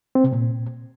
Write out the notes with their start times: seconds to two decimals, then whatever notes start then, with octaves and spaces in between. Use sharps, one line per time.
0.15 C4
0.24 C3
0.32 A#2